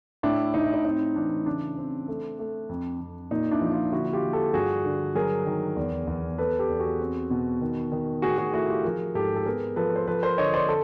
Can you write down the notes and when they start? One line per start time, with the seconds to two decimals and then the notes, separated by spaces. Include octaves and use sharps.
0.23 A2 D4 E4
0.54 A2 D#4
0.64 E4
0.74 D#4
0.85 C4 D#4
1.16 E3 D4
1.46 C#3 D4
1.78 C4
2.08 A3
2.39 A3
2.69 F2
3.00 F2
3.31 A#2 D#4
3.51 D4 E4
3.61 F3
3.72 D#4 F4
3.92 D3 E4 F#4
4.13 F4 G4
4.23 F3
4.33 G4 A4
4.54 G2 F#4 G#4
4.85 D3
5.15 F#3 G#4 A#4
5.46 D#3
5.76 E2
6.07 E2
6.38 B3 A4 B4
6.59 G4 A4
6.69 E2
6.79 F#4 G#4
7.00 C4
7.30 B2
7.61 D#3
7.92 D#3
8.22 A2 F#4 G#4
8.38 F#4 G#4
8.53 A3 E4 F#4
8.69 F4 G4
8.84 F3 G#4 A#4
9.15 G#2 G4 A4
9.36 A4
9.45 B3 G#4 A#4
9.76 F3 A4 B4
9.96 C5
10.07 F3 A4 B4
10.23 A#4 C5
10.38 D3 C#5 D#5
10.53 C5 D5
10.69 A4